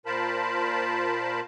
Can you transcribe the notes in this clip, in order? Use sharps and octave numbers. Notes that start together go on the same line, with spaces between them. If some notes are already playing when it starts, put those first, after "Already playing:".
A#2 F4 A#4 C5 A5 B5